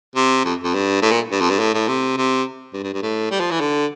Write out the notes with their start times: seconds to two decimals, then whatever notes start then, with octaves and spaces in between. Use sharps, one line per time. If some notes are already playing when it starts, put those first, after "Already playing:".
0.16 C3
0.45 F2
0.64 F2
0.74 G2
1.02 A2
1.11 A#2
1.31 G2
1.41 F2
1.50 G2
1.59 A2
1.74 A2
1.88 C3
2.17 C3
2.73 G2
2.83 G2
2.94 G2
3.03 A2
3.31 G3
3.40 F3
3.51 E3
3.60 D3